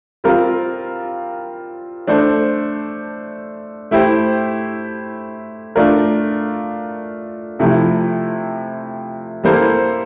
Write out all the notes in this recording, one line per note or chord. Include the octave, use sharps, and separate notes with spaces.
G3 C4 F4 A#4
A3 D4 A4 C5
A3 E4 G4 C5
A3 D4 F4 A#4
C3 F3 A3 E4
G3 A#3 E4 A4 C5